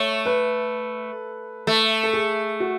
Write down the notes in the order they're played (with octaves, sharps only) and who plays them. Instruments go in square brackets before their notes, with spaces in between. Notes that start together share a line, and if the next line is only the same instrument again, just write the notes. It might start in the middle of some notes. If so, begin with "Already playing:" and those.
Already playing: [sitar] A3 [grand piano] C#5
[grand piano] B4
[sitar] A3
[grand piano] A4
G#4
F#4